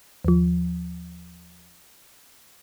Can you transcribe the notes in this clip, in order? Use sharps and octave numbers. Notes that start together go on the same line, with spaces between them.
D#2 F3